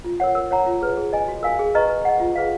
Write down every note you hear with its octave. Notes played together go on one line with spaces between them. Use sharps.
F4
A#4 C#5 F#5
A#4
C#5 F#5 A#5
F4
G#4 B4
G#4
D#5 G#5
F#4
A#4 F5 G#5
G#4
B4 D#5 A#5 C#6
B4
D#5 F#5
F4
G#4 B4 F5